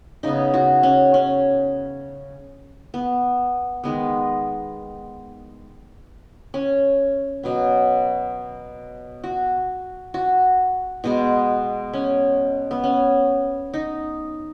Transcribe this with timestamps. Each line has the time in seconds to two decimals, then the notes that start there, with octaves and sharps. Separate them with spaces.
0.23 C#3 B3 D#4
0.54 F#4
0.83 C#4
1.14 C#4
2.94 B3
3.84 D#3 G#3 B3
6.54 C#4
7.43 B2 F#3 B3
9.24 F#4
10.14 F#4
11.04 B2 G#3 B3
11.93 C#4
12.71 B3
12.84 C#4
13.74 D#4